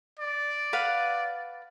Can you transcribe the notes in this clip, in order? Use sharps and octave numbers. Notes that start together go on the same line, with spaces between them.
D5
B4 F5 F#5